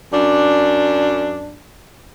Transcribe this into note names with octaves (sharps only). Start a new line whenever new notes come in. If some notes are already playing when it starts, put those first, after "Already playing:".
F#2 D4